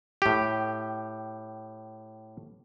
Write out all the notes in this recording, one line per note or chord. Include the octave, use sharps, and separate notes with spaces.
A2 G4